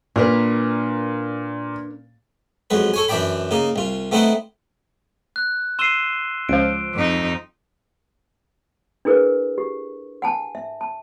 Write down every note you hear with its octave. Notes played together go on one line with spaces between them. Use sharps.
A#2 D4 A#4 B4
F2 F#3 G#3 B4
A4 C#5 G#5
F#2 E3 D4 D5 G5 B5
C#3 A#3 D#4
C2 F4
A3 B3 C4 D#4 E4 B4
F#6
C6 E6 C7 D#7 E7 G7
C#2 F3 D7
F2 D#4
D4 E4 G#4 A#4 B4
G4
F#5 G#5 A5
E5
A5